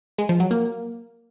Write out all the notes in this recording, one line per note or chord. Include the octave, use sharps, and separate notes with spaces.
G#3
F3
F#3
A#3